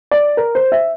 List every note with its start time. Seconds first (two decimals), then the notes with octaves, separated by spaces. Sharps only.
0.11 D5
0.37 A#4
0.55 C5
0.72 E5